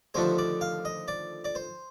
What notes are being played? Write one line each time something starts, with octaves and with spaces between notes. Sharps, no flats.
D#2 D3 F3 A3 C5
D5
F5
D#5
D5
D5
C5